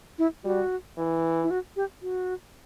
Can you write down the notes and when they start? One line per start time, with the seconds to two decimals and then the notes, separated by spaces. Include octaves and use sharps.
0.19 E4
0.44 G3 F#4
0.98 E3
1.43 E4
1.51 F#4
1.76 G4
2.02 F#4